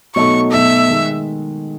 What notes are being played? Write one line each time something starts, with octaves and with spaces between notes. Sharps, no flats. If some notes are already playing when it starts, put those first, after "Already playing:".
B2 F#3 A3 D#4 A4 C#6
B2 F#3 A3 D#4 A4 E5
D#3 G#3